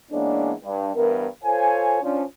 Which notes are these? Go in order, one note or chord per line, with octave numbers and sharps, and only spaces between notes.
E3 G#3 A#3 B3 C#4 D4
G2
G2 E3 B3 A#4
F4 A4 C5 C#5 F5 G#5
F3 C#4 D4